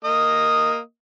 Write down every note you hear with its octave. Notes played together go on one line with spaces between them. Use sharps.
A#3 D#5 D#6